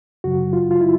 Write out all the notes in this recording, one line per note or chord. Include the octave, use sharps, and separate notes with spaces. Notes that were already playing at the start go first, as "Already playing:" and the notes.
F#2 C#3 F#3 F#4
F4
F4
E4